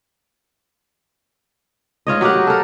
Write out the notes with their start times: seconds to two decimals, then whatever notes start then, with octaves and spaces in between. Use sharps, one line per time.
2.07 G#2 F4 C#5 D#5
2.21 F#3 G4 A#4 F#5
2.47 A4 A#4